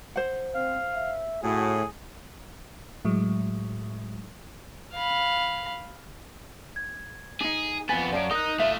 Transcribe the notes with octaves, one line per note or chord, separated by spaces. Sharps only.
C5 F#5
C4 F5
E5
A2 F#4 G#4
A2 F#3 G#3
F5 B5
G#6
D4 D#4 G#4
F2 B3 G#5 A6
F#2 C#5 D5 F5 A5 D7
D#4 A#4 D#6 F#6
A3 F4 E5